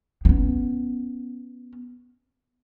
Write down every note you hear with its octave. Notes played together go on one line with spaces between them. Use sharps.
B3 C#4